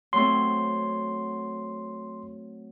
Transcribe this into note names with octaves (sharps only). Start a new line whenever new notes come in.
F#3 A3 C4 C6